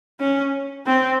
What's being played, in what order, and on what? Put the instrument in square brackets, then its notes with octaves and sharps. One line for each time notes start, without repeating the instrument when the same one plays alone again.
[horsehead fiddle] C#4
C4